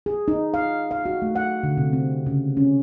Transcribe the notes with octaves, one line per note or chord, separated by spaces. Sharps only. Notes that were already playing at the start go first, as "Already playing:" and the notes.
G#4
D#4
F5
F5
F#4
A3
F#5
D3
C3
C4
C#3
C#4